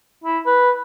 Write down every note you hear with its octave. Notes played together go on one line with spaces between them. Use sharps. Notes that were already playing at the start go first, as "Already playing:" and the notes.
E4
B4